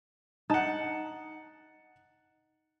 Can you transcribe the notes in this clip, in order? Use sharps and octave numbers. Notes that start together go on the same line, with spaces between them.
D#4 F#5 A5